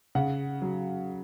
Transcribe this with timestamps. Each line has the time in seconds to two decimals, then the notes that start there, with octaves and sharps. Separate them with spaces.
0.15 C#3 F#5
0.62 F#3